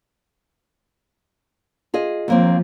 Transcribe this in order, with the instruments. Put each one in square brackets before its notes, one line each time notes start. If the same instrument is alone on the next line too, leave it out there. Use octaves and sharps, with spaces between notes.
[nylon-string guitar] F4 G#4 D#5
[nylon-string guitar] D#2 A#3 C4 [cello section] F3